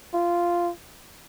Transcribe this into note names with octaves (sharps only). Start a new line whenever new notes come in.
F4